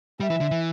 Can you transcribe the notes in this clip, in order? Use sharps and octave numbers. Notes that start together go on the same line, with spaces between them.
G3 E5
E3
D3
E3